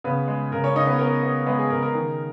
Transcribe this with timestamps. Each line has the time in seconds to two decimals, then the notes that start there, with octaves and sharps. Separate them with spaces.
0.04 C#3 B3 B4
0.28 G#3
0.52 C#3 A#4
0.64 C#4 C#5
0.76 C#3 D#4 D#5
0.87 B3 B4
0.99 B3 A#4
1.23 B3
1.46 G#3 B3 B4
1.59 G#4
1.70 C#3 A#4
1.82 A#4
1.95 D#3